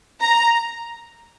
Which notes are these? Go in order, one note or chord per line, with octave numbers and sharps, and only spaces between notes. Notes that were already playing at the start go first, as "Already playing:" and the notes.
A#5